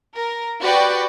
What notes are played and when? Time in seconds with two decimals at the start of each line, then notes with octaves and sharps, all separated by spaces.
0.15 A#4
0.61 F#4 G4 B4 D5 G5